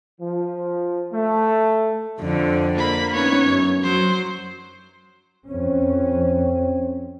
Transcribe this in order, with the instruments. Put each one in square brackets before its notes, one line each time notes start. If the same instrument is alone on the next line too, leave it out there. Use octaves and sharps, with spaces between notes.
[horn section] F3
A3
[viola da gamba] F2 D3
[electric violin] A#3 B5
[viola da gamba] B3 C#4 D#4 [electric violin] C#5
[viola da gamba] F#2
[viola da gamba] F#3 [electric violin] C5
[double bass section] F2 C#4 [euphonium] C4